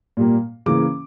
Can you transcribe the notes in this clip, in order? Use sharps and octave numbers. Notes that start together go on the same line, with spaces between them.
A#2 G3 A#3
C#3 E3 A#3 D6